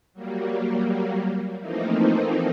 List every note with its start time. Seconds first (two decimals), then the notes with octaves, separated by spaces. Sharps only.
0.13 F#3 G3 A#3
1.60 E3 F3 A3 A#3 C4 D#4